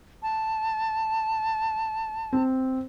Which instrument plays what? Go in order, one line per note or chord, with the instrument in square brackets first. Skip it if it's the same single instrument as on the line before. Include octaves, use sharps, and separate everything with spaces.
[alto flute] A5
[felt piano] C4